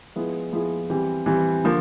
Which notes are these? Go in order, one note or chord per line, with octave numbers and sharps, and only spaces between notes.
F3 G#3 B3 E4 G#4
F3 G#3 B3 E4 G#4
E3 G3 C4
E3 G3 C4
D3 F3 A#3